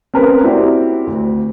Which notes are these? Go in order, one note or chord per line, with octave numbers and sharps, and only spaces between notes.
C4 C#4 A#4 B4
C4 E4 F#4 G4 D5
D2